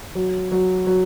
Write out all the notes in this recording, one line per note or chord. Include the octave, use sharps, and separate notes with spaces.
F#3
F#3
F#3